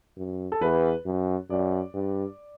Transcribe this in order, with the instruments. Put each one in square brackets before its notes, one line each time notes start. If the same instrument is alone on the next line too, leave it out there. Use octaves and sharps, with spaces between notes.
[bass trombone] F#2
[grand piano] A4
[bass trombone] E2 [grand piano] B4
[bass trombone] F#2
[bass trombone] F#2 [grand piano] D5
[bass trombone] G2